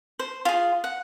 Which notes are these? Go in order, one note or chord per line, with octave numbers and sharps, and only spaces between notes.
C5
F4 G#4
F#5